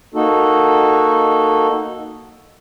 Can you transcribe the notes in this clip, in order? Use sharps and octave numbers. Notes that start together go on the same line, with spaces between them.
A#3 D#4 F#4 A4